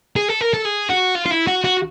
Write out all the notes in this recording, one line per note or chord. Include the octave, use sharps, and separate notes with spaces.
G#4
A4
A#4
A4
G#4
F#4
F4
F4
E4
F#4
F#4